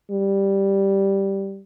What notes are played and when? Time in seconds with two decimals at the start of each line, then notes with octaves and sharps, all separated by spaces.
0.11 G3